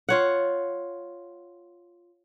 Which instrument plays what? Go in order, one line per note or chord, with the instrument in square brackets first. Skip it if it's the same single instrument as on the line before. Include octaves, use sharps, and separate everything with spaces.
[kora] F4 C#5 F#5